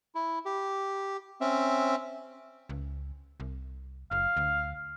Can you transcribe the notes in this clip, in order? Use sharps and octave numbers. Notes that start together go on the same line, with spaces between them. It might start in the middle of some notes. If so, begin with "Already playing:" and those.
E4
G4
C4 C#4 E5
C#2
C2
F#1 F5
D2